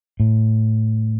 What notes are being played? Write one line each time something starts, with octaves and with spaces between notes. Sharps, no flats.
A2